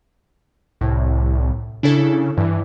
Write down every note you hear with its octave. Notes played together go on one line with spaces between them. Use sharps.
C2 A2
C#3 D4 E4 A4
G2 E3